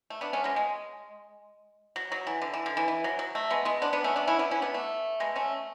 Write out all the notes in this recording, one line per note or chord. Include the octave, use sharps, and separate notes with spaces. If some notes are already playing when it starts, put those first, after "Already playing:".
A3
B3 D4
A3 C#4
G#3 B3
G#3
F#3
F#3
E3
D3
E3
D3
E3
E3
F#3
F#3
A3
G#3 B3
G#3 B3
B3 D4
B3 D4
A3 C#4
B3 D4
C#4 E4
B3 D4
C#4 E4
B3 D4
A3
G#3 B3
A3 C#4